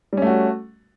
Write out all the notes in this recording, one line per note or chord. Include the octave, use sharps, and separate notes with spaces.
G3 A3 C#4 F#4